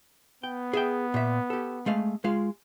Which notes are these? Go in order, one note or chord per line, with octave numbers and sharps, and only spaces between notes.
B3 G5
G#4 E5 G5
A#2 E5
G4 A4
G#3 A3 F5
G#3 F4 F5